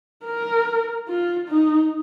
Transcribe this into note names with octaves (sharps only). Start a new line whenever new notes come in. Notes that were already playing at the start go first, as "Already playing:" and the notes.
A#4
F4
D#4